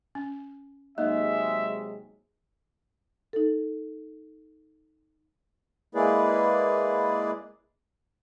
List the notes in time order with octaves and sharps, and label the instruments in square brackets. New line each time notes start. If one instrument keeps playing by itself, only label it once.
[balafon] C#4
[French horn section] C3 F#3 G#3 [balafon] A#3 D#4 [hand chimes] D#5 [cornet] E5
[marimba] D#4 A4
[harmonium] G#3 A#3 E4 G#4 B4 D5